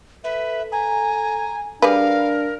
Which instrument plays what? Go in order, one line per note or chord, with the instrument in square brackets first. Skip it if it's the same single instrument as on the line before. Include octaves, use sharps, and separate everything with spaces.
[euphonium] A4 [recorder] B4 [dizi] E5
[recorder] G#5 [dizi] A#5
[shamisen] G3 G#4 B4 [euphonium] D4 [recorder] A#4 [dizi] F5